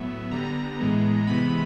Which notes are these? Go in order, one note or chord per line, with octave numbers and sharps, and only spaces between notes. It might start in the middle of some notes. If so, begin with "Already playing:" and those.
Already playing: A2 F#3 B3 E5
D3 G3 B3 A#5
A2 E3 G#3 B3
C3 E3 G#3 B3 B5